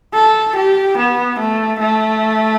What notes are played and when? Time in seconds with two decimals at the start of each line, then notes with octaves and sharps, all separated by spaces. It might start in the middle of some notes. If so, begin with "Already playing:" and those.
0.14 A4
0.56 G4
0.97 B3
1.39 A3
1.79 A3